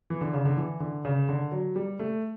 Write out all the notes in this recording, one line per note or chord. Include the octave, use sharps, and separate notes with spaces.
E3
D3
C#3
D3
E3
D3
C#3
D3
F#3
G3
A3